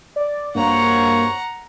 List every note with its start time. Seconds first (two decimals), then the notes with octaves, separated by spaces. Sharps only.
0.16 D5
0.55 G2 A#3 F#4 C5 C#5 F#5 A#5